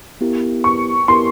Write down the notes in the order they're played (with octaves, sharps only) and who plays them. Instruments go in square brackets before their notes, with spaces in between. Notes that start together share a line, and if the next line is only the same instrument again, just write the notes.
[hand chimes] B3 E4 G4 A#4
[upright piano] C#6
[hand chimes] B3 E4 G4 A#4 [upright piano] C6